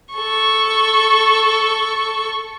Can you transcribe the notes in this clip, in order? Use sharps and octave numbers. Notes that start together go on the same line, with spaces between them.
A4 C#6